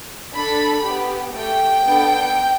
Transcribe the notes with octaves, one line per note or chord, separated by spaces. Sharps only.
D4 A4 B5
B3 G4
A3 G4 G5
B3 D4 A4